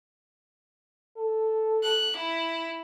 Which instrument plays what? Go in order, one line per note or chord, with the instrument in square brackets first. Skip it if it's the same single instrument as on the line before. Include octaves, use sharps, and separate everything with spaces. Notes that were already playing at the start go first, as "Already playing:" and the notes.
[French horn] A4
[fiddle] F#6
E4